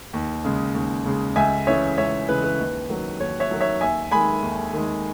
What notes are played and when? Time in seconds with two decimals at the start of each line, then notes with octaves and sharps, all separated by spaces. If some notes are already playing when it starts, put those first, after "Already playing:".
0.13 D#2
0.45 C#3 G#3
0.75 D#2
1.05 C#3 G#3
1.36 C#2 E5 G#5
1.67 C#3 E3 G#3 C#5 E5
1.98 C#2 C#5 E5
2.28 C#3 E3 G#3 B4
2.44 B4
2.59 D#2
2.89 D#3 F#3
3.20 D#2 C#5
3.40 C#5 E5
3.51 D#3 F#3
3.60 C#5 E5
3.81 D#2 E5 G#5
4.11 D#3 G#3 G#5 B5
4.43 D#2
4.73 D#3 G#3